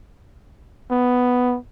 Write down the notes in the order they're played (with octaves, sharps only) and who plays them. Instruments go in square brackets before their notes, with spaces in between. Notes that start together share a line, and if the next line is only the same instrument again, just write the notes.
[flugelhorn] B3